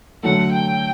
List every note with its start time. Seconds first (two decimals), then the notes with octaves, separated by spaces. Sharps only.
0.23 D3 F#3 A3 F#5
0.51 G5